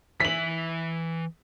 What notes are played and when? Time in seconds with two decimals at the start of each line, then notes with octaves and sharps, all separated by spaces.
0.20 E3 E5 B6 F#7